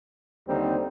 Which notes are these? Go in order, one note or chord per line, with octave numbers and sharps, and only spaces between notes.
D#2 D3 G3 C4 D#4